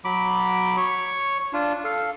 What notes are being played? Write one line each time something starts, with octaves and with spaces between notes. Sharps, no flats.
F#3 B5 D6
C#5 C#6
D4 F4
A4 F5